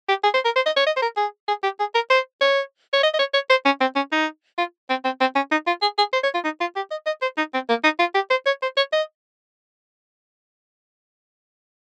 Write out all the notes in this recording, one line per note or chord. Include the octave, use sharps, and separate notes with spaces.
G4
G#4
C5
A#4
C5
D#5
C#5
D#5
C5
A#4
G#4
G#4
G4
G#4
A#4
C5
C#5
C#5
D#5
D#5
C#5
C#5
C5
C#4
C4
C#4
D#4
F4
C4
C4
C4
C#4
D#4
F4
G#4
G#4
C5
C#5
F4
D#4
F4
G4
D#5
D#5
C5
D#4
C4
A#3
D#4
F4
G4
C5
C#5
C5
C#5
D#5